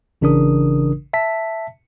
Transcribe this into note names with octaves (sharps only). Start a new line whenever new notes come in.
A1 C#3 E3 D4 A#4 D#6
E5 A5 B6